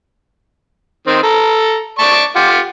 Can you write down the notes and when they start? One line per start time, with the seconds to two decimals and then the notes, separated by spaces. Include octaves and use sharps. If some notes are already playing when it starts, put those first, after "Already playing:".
1.07 D#3 C4
1.23 A4 A#5
1.99 D5 A5 C#6
2.36 F4 G4 F#5